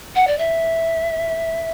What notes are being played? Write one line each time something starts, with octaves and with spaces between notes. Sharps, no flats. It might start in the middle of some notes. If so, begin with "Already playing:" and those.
F#5
D5
E5